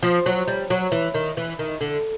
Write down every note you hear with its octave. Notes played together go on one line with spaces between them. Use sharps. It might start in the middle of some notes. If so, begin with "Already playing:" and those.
F3
F#3
G3
F#3
E3
D#3
E3
D#3
D3